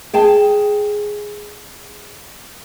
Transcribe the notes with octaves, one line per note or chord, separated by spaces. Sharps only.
G#4 G5 A5